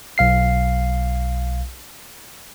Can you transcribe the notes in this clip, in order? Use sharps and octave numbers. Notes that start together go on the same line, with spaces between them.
B1 F5 C7